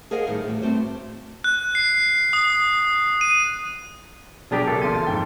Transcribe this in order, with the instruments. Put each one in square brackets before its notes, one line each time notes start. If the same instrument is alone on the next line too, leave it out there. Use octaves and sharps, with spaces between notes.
[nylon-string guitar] G#4 A#4 C5 D#5 F5 F#5
A2 D#3 G3
E2 A2
G2 A3 C4 F#4 C5 D5
[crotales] F#6
C7
D#6
D#7
[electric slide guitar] B2 D4 G4 [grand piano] F#3 [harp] G#4 A#4
[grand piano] B1 C#3 [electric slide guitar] A4
[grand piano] A1 A#2 [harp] C6 A6 D#7
[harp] A6
[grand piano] F2 G#2 G5